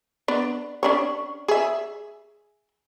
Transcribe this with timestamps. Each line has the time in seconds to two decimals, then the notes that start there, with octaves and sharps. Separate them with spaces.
0.28 B3 D4
0.83 C#4 D4 C#5
1.48 G#4 E5